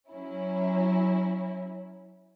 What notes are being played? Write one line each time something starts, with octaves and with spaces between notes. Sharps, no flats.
F#3 C#4 E4